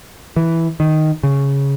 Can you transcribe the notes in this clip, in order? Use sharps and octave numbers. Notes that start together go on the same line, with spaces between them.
E3
D#3
C#3